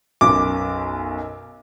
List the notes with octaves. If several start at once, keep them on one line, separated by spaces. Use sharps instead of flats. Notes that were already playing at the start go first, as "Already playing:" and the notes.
B1 F#2 D6